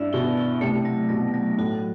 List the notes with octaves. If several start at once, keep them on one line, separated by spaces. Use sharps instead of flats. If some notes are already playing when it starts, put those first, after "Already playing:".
Already playing: G2 E4 D5 E5
B2 E4
E4
C3 A3
F#3
B2 F#3
F#3
A2 F#4